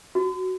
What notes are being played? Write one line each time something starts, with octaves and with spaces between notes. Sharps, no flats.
F#4